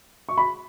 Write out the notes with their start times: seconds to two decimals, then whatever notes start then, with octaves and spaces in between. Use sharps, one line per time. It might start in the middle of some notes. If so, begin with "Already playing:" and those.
0.29 C#6
0.38 B5